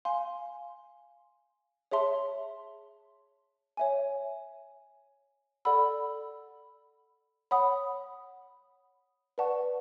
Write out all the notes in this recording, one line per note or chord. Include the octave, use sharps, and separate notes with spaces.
F5 G#5 C6
G#4 C#5 E5 A5 C6
C#5 E5 G#5
A4 D5 F#5 B5 E6
C#5 F#5 B5 D#6
B4 D5 F#5 A5 C#6